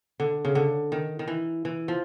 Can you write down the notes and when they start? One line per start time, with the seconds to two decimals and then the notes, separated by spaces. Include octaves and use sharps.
0.20 D3
0.45 C#3
0.55 D3
0.92 D#3
1.19 D#3
1.28 E3
1.65 E3
1.88 F3